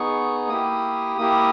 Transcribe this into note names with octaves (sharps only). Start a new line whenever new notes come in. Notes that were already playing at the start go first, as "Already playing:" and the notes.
Already playing: B3 D#4 G#4 C#6
A#3 E4 G4 D#6
A#3 E4 G4 D#6